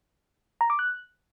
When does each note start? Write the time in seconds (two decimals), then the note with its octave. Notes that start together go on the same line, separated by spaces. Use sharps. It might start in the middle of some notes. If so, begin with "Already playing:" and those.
0.61 A#5
0.70 D6
0.79 F#6